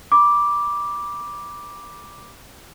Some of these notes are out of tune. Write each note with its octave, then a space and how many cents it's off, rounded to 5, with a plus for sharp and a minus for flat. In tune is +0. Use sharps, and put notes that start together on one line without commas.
B5 -30 D6 +0